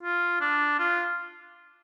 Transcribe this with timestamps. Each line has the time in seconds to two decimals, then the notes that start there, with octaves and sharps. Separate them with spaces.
0.03 F4
0.41 D4
0.79 F4